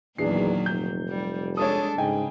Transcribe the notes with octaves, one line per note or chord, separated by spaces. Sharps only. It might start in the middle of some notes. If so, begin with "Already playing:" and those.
E2 A#2 D#3 F#3 D4 G#4 C7
F1 G6
G3
G#3 D4 A4 C#5 D#6
G#2 C#3 D#5 G5 G#5